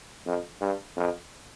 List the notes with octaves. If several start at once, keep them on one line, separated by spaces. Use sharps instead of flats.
F2
G2
F2